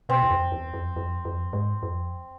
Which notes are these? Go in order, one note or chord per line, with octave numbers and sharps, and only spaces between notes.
B2 C4
E2
F2
E2
F2
F2
F2
G#2
F2